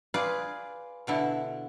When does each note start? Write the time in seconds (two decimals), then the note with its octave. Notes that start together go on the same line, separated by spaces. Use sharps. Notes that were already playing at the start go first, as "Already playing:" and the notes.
0.14 F4 G#4 B4 D5
1.07 B2 D3 E4